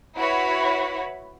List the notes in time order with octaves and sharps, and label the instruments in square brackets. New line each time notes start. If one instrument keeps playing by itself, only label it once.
[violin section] E4 F#4 B4 C#5 B5